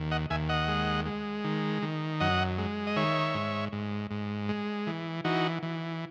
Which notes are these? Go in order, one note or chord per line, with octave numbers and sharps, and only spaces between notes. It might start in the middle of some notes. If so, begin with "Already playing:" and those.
Already playing: D#2
D#5 F#5
D#2 E5 G#5
D#5 F#5
G#3
G#3
D#3
D#3
F#2 D#5 F#5
G#3
D#5
D#3 C#5 E5
G#2
G#2
G#2
G#3
E3
E3 D#4 F#4
E3